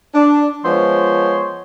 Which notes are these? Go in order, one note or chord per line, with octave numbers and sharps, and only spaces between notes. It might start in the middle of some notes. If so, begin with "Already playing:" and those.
D4
F3 G#3 B3 C5 C#5